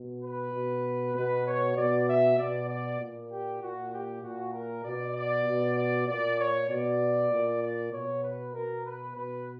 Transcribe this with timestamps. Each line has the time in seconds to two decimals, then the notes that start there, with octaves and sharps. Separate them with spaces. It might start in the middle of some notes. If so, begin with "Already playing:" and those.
Already playing: B2
0.23 B4
0.53 B2
1.15 B2 B4
1.46 C#5
1.76 B2 D5
2.07 E5
2.38 B2 D5
2.69 D5
3.00 A#2
3.31 G4
3.61 A#2 F#4
3.92 G4
4.23 A#2 F#4
4.54 A#4
4.84 B2 D5
5.15 D5
5.46 B2
5.77 D5
6.08 A#2 D5
6.39 C#5
6.69 B2 D5
7.31 A#2
7.61 D5
7.92 B2 C#5
8.23 B4
8.54 B2 A#4
8.85 B4
9.15 B2 B4